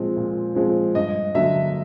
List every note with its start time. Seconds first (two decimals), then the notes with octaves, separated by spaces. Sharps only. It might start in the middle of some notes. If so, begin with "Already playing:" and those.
Already playing: A#2 F3 G#3 C4
0.17 A#2
0.55 F3 G#3 C4
0.95 G2 D#5
1.35 D3 F#3 A#3 E5